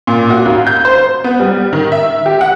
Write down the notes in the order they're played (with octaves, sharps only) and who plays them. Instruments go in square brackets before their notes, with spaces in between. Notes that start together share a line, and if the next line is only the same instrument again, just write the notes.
[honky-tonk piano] A#2
F#4
D#2
G6
C5
B3
G3
D#3
E5
G4
F#5